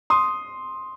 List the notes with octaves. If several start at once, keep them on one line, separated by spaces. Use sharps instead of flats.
C6 D#6